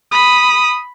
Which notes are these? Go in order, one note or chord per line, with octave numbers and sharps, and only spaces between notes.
B5 D#6